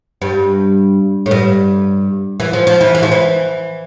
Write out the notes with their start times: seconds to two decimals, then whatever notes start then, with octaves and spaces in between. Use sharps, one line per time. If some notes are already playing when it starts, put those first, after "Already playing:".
0.22 G2
1.26 A2
1.31 G2
2.40 E3
2.53 F3
2.67 F3
2.81 E3
2.95 E3
3.03 F3
3.12 E3